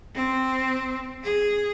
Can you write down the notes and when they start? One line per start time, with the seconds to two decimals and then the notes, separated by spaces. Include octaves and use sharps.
0.15 C4
1.23 G#4